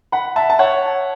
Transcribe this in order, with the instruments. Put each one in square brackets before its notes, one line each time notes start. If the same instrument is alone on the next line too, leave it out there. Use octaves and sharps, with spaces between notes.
[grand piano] F#5 B5
E5 A5
A5
C#5 F#5